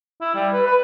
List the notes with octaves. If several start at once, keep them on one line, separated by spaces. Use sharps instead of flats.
E4
G3
B4
B4